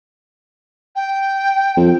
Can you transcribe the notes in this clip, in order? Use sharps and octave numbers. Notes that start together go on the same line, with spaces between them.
G5
F2